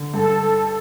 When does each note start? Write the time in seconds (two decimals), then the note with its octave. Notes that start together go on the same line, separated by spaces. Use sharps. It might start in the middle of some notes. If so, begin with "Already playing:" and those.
Already playing: D3
0.14 G2 A4